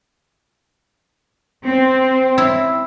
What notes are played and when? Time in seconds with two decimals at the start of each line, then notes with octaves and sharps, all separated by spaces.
1.65 C4
2.38 E4